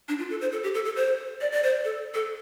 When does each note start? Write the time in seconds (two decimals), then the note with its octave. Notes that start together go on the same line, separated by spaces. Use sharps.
0.09 D4
0.19 F4
0.30 A4
0.41 C5
0.52 A4
0.63 G4
0.74 A4
0.85 A4
0.96 C5
1.41 D5
1.52 D5
1.63 C5
1.85 A4
2.14 A4